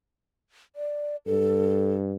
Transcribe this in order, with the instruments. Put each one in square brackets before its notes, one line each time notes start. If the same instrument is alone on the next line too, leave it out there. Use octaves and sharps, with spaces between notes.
[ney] D5
[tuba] G2 [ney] A4